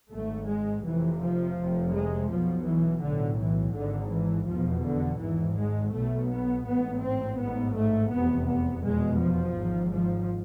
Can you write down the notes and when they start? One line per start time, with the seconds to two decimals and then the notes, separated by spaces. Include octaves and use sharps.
0.12 G#1 G#2 A3
0.49 G#3
0.85 F1 F2 C3 E3
1.22 F3
1.58 F1 F2 C3
1.94 G#3
2.30 B1 B2 F3
2.67 E3
3.03 B1 A2 D3
3.40 E3
3.75 G#1 G#2 D3
4.13 E3
4.49 F1 E2 B2 F3
4.85 D3
5.21 G#1 G#2 E3
5.57 G#3
5.94 B1 B2 A3
6.30 B3
6.67 A1 G#2 B3
7.03 C4
7.39 A1 G#2 B3
7.76 A3
8.12 F1 E2 C3 B3
8.48 B3
8.84 F1 E2 B2 G#3
9.20 F3
9.56 G#1 G#2
9.93 F3